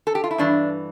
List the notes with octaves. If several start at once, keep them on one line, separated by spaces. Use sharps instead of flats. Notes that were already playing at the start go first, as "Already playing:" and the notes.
A4
G4
F4
E4
G2 E3 D4